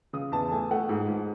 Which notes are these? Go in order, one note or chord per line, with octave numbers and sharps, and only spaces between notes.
C#3 D#6
E2 A5
A3 G#5
A3 F#5
G#2
G#2